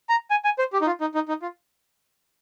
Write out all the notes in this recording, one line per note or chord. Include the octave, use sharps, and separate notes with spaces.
A#5
G#5
G#5
C5
G4
D#4
F4
D#4
D#4
D#4
F4